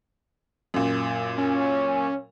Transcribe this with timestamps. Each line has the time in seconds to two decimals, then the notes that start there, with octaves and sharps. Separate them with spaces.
0.74 F#2 A#2
1.38 C#4